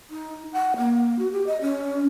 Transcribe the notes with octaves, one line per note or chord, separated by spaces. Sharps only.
D#4
F#5
A#3
F#4
G4
D#5
C#4